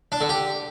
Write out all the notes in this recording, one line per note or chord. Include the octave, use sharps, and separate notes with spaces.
D4
D3
G4